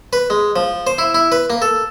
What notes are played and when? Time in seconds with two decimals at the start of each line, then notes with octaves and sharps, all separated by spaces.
0.13 B4
0.30 G#3
0.56 F3
0.87 C5
0.98 E4
1.15 E4
1.32 B4
1.50 A#3
1.62 A4